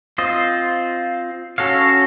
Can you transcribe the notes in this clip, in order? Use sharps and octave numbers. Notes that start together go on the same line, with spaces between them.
C4 F4 C5 D#5
C#4 F#4 A4 C#5 F5